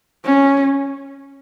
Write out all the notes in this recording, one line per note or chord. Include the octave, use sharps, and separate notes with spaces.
C#4